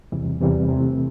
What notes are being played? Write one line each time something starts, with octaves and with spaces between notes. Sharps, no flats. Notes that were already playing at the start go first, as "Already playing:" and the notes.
E2 C3 E3 G3
E2 C3 E3 G3
C3 E3 A3 C4